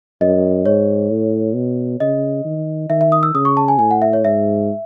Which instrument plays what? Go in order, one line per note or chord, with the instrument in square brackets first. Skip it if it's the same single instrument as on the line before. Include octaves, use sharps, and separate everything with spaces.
[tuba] F#2 [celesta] D#5
[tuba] G#2 [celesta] C#5
[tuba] A2
B2
[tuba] C#3 [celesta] D#5
[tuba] D#3
[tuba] D#3 [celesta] E5
[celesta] E5
D#6
E6
[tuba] C#3 [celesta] D#6
[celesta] C#6
A5
G#5
[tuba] A2 [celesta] G#5
[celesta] F#5
E5
C#5
[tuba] G#2 [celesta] E5